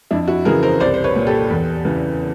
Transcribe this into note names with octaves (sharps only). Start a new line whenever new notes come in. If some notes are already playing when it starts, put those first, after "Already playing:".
F2 D4 E4
E4 F#4
C#3 E3 G#4 A#4
A#4 C5
C2 C5 D5
C5
B4 C#5
A#2
G4 A4
E2
C#3 E3